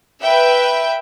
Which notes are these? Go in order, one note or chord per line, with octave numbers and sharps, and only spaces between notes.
B4 E5 G5